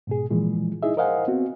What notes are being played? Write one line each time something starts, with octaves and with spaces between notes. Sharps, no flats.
G#2 B2 G#4
A#2 E3 F3 G#3
D#4 E4 G#4 D#5 E5
A#4 C5 D#5 F5 F#5 G#5
B3 C4 F#4